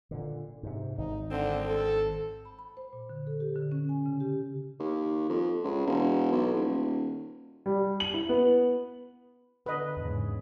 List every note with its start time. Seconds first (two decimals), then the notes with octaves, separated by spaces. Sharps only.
0.11 A#2 D3
0.63 G#2 C3
0.98 G#1 D#4
1.31 D3 C4
1.65 A4
2.45 B5
2.59 B5
2.77 C5
2.93 A#2
3.10 D3
3.27 A4
3.40 G4
3.56 D3
3.72 C#4
3.89 G#5
4.06 C#3
4.20 G4
4.79 D#2
5.29 F2
5.64 C#2
5.87 E1
6.32 B1
6.54 D#1
7.66 G3
8.00 F#7
8.14 E4
8.29 B3
9.66 D3 B4 D#5
9.97 E2 G#2 C#3